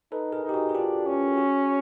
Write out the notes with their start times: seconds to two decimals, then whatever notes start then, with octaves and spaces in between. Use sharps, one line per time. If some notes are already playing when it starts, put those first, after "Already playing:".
0.12 D#4 A4 B4
0.32 G#4 A#4
0.43 D#4
0.49 G4
0.54 F#4 G#4
0.69 G#4
0.74 D4 F4 G4
1.06 C#4
1.37 F#4 G#4